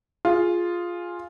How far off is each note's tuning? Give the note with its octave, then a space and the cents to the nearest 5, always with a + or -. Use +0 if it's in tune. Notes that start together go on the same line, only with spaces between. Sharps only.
F4 +0 G#4 +0